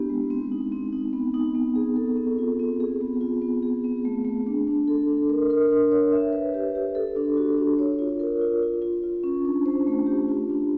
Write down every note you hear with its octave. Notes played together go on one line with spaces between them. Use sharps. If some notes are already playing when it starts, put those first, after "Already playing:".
Already playing: B3 D4 E4 G4
G#3
C4
D#4
C4
D#4
B3
D#4
B3
G#4
A4
C4
F4
C4
G#4
B3
F4
B3
G#4
C4
A3
A3
D4
D4
A4
D4
A#4
A#4
D4
C#5
E5
B4
G4
G4
A4
D4
F#4
D4
C#5
F4
A#4
F4
F4
F4
F4
C#4
D4
C5
A3
G4
F4
D4